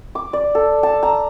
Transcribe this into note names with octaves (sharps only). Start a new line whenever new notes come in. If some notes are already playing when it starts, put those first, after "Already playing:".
D6
D5
A4
A5
A#5